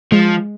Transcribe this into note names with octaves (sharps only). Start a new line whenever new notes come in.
F3 G#3